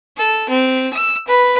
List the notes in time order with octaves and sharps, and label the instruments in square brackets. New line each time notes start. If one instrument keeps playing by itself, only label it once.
[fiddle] A4
C4
E6
B4